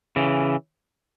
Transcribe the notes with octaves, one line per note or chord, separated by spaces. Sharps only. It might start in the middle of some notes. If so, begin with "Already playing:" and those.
C#3 E3